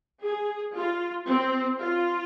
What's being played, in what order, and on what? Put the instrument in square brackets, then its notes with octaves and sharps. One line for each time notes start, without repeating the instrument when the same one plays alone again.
[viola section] G#4
F4
C4
F4